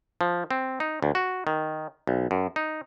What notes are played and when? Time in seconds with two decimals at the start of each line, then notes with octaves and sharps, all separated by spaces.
0.21 F3
0.51 C4
0.80 D#4
1.02 D2
1.15 F#4
1.47 D#3
2.07 B1
2.31 F#2
2.56 D#4